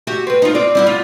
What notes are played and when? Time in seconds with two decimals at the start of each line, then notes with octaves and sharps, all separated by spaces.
0.07 F#4 G4 E5
0.27 C4 B4
0.42 D#4 F4
0.55 C4 F4 D5
0.75 G3 E4 F#4
0.87 F4